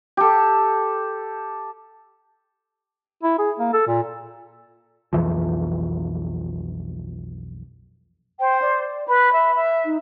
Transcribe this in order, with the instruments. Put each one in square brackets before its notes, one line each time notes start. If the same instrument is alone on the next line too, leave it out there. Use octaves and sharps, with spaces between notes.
[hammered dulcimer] G4 A4
[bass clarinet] E4
G#4
A#3
A4
A#2
[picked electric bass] B1 F2 E3 F3
[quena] C5 [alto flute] G5
[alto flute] D5
[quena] B4 [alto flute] B5
[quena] E5
E5
[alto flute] D#4